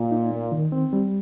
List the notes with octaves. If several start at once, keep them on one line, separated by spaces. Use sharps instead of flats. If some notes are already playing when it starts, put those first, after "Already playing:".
Already playing: A#2
D#4
A#3
D#3
C4
G3